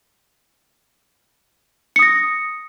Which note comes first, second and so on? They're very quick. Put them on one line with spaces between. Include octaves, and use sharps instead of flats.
C#7 D#6 A#6